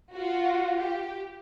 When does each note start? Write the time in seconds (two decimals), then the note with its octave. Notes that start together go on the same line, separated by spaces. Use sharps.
0.12 F4 F#4
0.79 G4